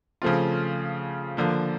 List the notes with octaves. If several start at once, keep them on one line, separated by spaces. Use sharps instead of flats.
C#3 F3 A3 C4 F4
D3 F3 A#3